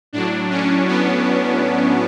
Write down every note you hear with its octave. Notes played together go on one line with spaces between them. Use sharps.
A2 F#3 D4
C#4
B3